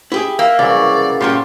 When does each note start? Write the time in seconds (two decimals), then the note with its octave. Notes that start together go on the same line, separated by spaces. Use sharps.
0.12 E4 G4 G#4
0.39 A#3 E5
0.59 C2 C#3 E3 F#3 D5
1.21 G2 A#2 C#4 F4 G4 C6